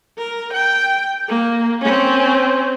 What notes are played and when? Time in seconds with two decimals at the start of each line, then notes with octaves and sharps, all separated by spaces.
0.18 A#4
0.53 G5
1.28 A#3
1.81 C4 C#4